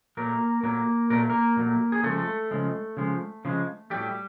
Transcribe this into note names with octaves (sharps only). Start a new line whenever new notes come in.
A#2 F#3 A3 A#3 A#4
A#2 F#3 A3 A#3 A#4
A#2 F#3 A3 A#4
A#3 A#4
A#2 F#3 A3
G#4
C#3 F3 G#3 A3 A4
C#3 F3 G#3
C#3 F3 G#3
C#3 F3 G#3
A2 F#3 G3 A3 G4